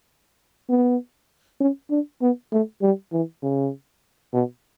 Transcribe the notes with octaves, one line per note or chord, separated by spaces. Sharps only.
B3
C#4
D4
B3
A3
G3
E3
C#3
B2